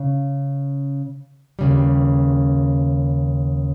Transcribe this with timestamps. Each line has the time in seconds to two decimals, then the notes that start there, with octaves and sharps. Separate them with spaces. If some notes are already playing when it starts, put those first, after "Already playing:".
Already playing: C#3
1.59 D#2 C#3 G3